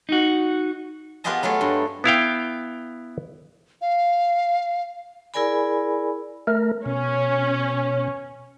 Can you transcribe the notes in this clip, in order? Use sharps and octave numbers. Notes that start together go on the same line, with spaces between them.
D#4 F#4
B3 F4 G4 G#4 D#5 A5
F#3 A3 F4 G#4
G2
B3 E4 F5 G5
F5
E4 G#4 A#4 D5 G#5 B5
A3 A#4
B2 C#4